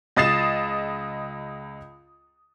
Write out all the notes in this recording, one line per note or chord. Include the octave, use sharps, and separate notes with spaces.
C#2 D#5 D#6 A6 C7 E7